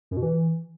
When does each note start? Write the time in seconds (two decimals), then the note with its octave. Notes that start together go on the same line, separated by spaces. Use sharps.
0.11 F#2
0.17 B2
0.23 E3